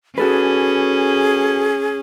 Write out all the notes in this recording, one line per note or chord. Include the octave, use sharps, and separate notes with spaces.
C#4 F#4 G#4 A4 B4